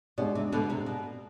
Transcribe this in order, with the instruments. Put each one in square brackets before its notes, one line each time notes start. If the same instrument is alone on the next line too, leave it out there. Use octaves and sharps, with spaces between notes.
[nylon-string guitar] B2 [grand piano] G#3 D4 G4 D5
[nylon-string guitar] C3
B2 D3
C3
B2